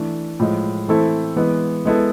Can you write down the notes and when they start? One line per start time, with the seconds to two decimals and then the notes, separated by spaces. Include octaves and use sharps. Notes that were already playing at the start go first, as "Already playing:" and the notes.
Already playing: E3 A3 D4
0.40 A2 F3 G#3
0.88 E3 A3 C4 E4 A4
1.36 E3 G#3 B3
1.85 G#3 B3 E4 A4